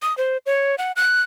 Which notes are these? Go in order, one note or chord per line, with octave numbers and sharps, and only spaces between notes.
D#6
C5
C#5
F#5
F#6